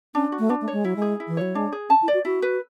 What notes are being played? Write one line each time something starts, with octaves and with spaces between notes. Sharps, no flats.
C#4 D4
F#4
A3
B3 D4
A3
G#3 C#5
F#3 E4
G#3
G#4
E4
E3
F#3 C#5
G#3 D4
G#4
C#4 A5
E4
D5
F#4
E4 F#4
B4